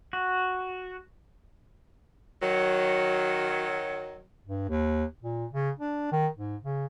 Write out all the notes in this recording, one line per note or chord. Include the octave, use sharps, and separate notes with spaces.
F#4
D#3 F#3
G2
D#2
A#2
C#3
D4
D#3
G#2
C#3